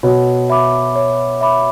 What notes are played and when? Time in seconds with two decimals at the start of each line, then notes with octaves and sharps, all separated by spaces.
0.03 B2 C#5
0.50 E5 B5 D6
0.96 C#5
1.41 E5 B5 D6